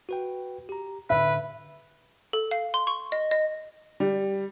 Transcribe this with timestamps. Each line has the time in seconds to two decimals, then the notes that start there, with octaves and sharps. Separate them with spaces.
0.09 F#4 B4 G5
0.69 G4 A#5
1.10 A2 D3 B4 E5
2.33 A4
2.51 F5
2.74 C6
2.87 C#6
3.12 D#5
3.31 D#5
4.00 G3